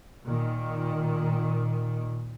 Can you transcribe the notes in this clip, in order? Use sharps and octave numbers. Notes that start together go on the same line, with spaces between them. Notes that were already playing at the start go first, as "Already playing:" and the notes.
A#2 D#3